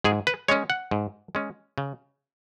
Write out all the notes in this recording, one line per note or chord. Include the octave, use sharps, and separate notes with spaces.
G#2 G#4
B4
G#3 C#4 C#5
F#5
G#2
G#3 C#4
C#3